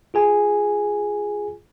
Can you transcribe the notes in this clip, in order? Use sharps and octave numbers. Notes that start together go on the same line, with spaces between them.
F4 G#4 G#5